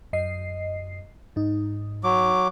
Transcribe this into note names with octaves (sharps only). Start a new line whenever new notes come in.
F#2 D#5 C7
G#2 D#4
F#3 D6